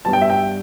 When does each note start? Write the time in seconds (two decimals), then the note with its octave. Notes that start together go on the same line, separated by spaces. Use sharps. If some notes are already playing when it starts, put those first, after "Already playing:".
0.05 G2 G3 B3 A5
0.13 G5
0.22 E5
0.30 G5